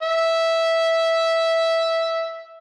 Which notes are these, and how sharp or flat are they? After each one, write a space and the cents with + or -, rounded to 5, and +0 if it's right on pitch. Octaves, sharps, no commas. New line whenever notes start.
E5 -5